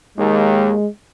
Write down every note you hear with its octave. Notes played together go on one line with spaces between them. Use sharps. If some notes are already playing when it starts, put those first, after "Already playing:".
D#2 G#3